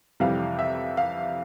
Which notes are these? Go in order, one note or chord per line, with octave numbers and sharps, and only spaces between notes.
F2 C3 E3 G3 F5
E5
F5